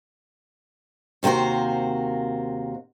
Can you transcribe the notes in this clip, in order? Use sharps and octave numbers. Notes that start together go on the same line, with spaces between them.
D#2 C3 A#3 F#4 C5